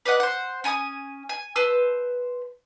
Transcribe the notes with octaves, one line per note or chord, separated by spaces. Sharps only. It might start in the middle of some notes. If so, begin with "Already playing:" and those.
B4 D5 D#5 F#5
C5 F#5
C#4 G#5 B5 D#6
G#5
B4 C5 A5 E6